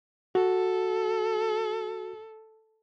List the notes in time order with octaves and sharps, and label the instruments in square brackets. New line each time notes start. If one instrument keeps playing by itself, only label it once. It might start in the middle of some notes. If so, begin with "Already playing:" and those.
[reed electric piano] F#4 [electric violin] A4